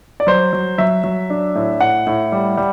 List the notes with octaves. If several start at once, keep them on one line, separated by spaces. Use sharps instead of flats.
D5
F#3 C5
F#3
F#3 E5
F#3
D4
A2
A2 F#5
A2
G3
G3